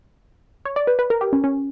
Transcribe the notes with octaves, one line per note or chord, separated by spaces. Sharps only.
C#5
D5
B4
B4
A#4
G4
C#4
C#4